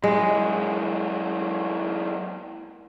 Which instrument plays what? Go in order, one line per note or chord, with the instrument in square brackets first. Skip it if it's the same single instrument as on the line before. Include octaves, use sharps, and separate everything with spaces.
[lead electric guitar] F#2 E3 [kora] G#3